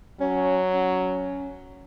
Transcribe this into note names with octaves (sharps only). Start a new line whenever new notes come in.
F#3 C#4
C#4